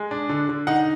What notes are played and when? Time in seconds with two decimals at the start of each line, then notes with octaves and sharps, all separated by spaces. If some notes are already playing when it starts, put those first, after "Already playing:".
Already playing: G#3
0.11 D4
0.29 D3
0.49 D3
0.67 D#4 F#5